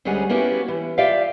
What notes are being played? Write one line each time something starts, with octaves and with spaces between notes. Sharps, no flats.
D2 G3 G#3 C#4 F#5 G#5
A#3 B3 C#4 E4 F#4 G4
E3
F4 G4 D5 E5 F5